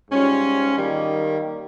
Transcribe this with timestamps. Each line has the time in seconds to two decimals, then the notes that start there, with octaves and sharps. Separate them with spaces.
0.10 G#2 G3 C#4 F4
0.77 D#3 G3 A#3